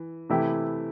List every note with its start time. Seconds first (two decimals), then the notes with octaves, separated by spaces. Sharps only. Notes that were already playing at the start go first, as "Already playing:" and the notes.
Already playing: E3
0.29 C3 E3 A3 E4 G4